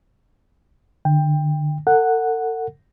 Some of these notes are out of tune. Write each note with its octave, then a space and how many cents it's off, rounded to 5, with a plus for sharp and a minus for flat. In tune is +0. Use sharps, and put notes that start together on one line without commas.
D3 +30 G5 +15
A4 +45 F#5 +0